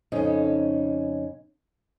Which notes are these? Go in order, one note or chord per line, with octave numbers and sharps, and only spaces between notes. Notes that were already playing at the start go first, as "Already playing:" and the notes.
F2 C#3 C#4 D#4